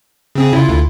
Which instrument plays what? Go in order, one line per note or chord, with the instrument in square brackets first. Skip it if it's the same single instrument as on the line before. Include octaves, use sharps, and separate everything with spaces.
[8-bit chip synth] C#3 C4 G#4
[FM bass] C#3 [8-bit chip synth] E4 F4
[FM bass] D2